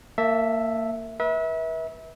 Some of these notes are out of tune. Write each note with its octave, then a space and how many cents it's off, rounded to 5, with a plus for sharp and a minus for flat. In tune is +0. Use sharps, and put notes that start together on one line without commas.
A#3 -30 E5 +0 A5 +10
B4 -35 E5 -30